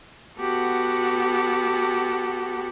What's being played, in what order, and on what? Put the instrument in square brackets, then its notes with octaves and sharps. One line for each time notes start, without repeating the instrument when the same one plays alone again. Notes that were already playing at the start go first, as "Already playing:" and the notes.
[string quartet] B3 F#4 G4 A4 F#5